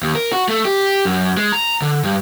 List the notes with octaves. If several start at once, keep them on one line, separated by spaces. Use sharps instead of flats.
D#2
A#4
F#4
A3
G4
F#2
G#3
A#5
D3
G2